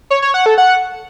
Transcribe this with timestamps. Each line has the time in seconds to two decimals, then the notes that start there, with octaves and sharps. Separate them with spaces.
0.10 C#5
0.22 C#5
0.34 F#5
0.46 A4
0.58 F#5